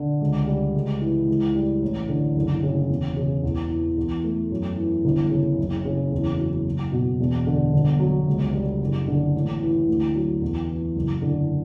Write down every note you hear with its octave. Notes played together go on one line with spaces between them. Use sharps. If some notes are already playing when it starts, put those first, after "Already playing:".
Already playing: D3
C#2
G3
C#2
E3
C#2
G3
A1
D3
F#1
C#3
E1
C#3
E2
E3
E2
A3
F#2
E3
G1
C#3
F#1
C#3
E2
F#3
F#1
B2
E1
D3
G1
F#3
C#2
G3
F#1
D3
A1
E3
D2
F#3
E2
E3
F#1
D3